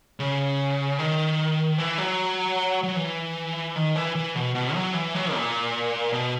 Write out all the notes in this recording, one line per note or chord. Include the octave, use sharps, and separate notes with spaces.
C#3
D#3
E3
F#3
F#3
E3
D#3
E3
E3
B2
B2
F#3
E3
F#3
A#2
B2